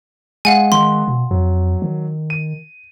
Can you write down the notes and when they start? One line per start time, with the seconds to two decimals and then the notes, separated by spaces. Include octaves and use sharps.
0.45 G#3 F5 F#5 G#5
0.72 D#3 C6
1.08 B2
1.31 F2 F#3
1.82 D#3
2.30 D#7